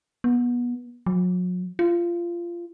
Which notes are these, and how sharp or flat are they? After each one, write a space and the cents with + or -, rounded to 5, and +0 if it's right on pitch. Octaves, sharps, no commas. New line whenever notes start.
B3 -25
F#3 -40
F4 -20